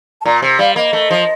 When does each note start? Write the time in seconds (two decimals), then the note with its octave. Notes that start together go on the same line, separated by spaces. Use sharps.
0.21 A5
0.25 A#2 A#5
0.42 C3
0.59 G3 F5
0.76 A#3 D#5
0.93 A3
1.11 F3